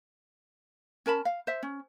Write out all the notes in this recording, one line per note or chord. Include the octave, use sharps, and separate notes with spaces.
C#4 A#4 A5 B5
F5
C5 E5
C#4